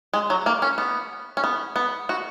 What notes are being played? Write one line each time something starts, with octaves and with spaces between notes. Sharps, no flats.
G#3
F#3
A#3
C#4
B3
C#4
B3
B3
F#4